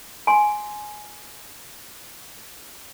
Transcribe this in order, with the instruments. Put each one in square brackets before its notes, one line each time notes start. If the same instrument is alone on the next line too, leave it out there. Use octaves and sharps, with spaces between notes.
[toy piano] G#5 C6